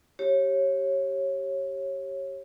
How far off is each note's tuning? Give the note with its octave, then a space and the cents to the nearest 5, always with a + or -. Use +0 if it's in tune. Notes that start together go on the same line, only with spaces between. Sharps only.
G4 -15 C#5 -25